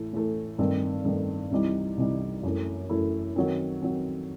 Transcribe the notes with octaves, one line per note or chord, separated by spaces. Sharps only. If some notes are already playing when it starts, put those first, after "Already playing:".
Already playing: A2 E3 A3
A2 E3 A3
G2 D#3 A3 C4
G2 D#3 A3 C4
C2 C3 E3 G3 D#4
C2 C3 E3 G3 D#4
F#2 E3 A3 E4
F#2 E3 A3 E4
D#3 F#3 C4
D#3 F#3 C4